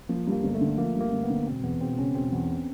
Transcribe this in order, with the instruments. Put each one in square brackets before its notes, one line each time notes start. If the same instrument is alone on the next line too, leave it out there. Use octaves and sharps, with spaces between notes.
[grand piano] F3 [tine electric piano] A#3
[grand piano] G2
[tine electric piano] A#3
[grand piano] G1
[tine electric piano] A3
[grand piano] D3
[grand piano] F3 [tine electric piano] A#3
[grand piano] G2
[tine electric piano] A#3
[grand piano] G1
[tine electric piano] B3
[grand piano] D3
[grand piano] E1 [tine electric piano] C4
[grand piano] E2 [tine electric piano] B3
[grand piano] E1 [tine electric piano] C4
[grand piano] C#3 [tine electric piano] C#4
[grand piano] E1 [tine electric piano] C4
[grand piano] E2